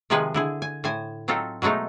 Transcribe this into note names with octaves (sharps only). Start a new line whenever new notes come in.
C3 D#3 F3 G#3 G#4 B4
D3 E4 G#4
G#5
A2 C5 G#5
F#3 C4 D#4 F4 A4
B2 F#3 G#3 A3 D#4